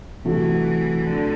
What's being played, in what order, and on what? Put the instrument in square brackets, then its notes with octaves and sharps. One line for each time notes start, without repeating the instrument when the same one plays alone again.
[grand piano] C3 F#3 A3 [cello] E3
[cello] D3